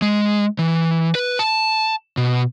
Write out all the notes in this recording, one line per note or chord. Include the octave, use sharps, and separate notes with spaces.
G#3
E3
B4
A5
B2